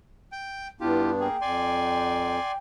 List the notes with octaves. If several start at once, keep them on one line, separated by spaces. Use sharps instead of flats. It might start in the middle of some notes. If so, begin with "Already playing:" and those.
G5
G2 B3 D4 E4 F4 G4
A#3 G#4 G5
F2 D5 G#5 C6